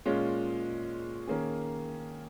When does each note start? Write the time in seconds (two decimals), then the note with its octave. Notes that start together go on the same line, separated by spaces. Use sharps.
0.05 A#2 G#3 C#4 F4
1.27 D#3 A#3 C#4 G#4